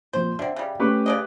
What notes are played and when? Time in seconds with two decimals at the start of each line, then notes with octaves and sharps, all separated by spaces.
0.13 A#2 F3 C5
0.39 D3 C4 E5
0.56 C#3 G3
0.80 A3 C#4 G4 B4 C#6
1.06 C#3 D5 D#5